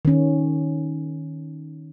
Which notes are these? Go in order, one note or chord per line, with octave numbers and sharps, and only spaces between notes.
D#3 C#4